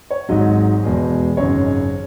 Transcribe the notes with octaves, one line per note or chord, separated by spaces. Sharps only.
C#5
G#1 G#2 F#3 D#5
E1 E2 B2 G#3
G#1 F#2 C#3 G#3 C#5